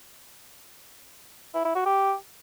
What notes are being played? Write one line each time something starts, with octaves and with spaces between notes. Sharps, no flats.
E4
E4
F#4
G4